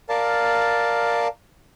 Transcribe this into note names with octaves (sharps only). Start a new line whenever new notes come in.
A#4 D5 F5 A5